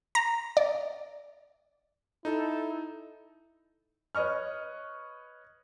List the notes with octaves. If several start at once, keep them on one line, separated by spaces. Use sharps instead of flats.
A#5
D5
D#4 E4 A4
B4 C#5 D#5 C#6 F6